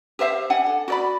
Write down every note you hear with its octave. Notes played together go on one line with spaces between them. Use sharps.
G4 C5 E5 F5
D4 F#5 G#5
A4
F#4 D5 B5